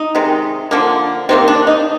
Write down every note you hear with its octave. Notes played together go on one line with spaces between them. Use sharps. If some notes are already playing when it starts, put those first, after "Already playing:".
Already playing: D#4
C3 D#3 G#3
D3 F3 A#3
C3 D#3 A#3 C4
D4
D#4